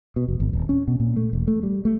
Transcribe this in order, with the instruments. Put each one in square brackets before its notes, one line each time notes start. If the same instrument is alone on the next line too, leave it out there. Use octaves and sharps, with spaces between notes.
[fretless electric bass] B2
F1
G#1
D#1
C#4
B2
A#2
A3
E1
A3
G3
A3